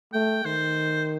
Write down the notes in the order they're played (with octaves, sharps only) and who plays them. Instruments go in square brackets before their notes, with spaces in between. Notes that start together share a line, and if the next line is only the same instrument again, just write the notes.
[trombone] A3 [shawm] G5
[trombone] D#3 [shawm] C5